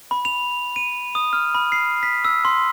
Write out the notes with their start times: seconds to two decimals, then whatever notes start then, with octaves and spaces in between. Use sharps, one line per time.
0.11 B5
0.25 F7
0.76 D#7
1.15 D#6
1.33 F6
1.55 B5
1.72 C7
2.03 B6
2.24 E6
2.45 C6